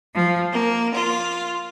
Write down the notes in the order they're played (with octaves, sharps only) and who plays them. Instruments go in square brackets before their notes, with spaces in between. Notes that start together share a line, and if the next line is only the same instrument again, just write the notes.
[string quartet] F3
A#3
F4